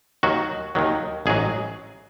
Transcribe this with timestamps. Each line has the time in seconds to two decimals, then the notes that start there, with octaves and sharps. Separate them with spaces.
0.23 D#2 D#3 F#3 F#4
0.75 D#2 D#3 F#3
1.26 A1 G#2 F#3 G#4